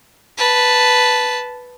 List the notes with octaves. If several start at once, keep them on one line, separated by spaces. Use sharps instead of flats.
B4 A5